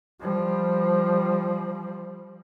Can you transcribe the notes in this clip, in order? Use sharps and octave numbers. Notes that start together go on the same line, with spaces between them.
F3 G3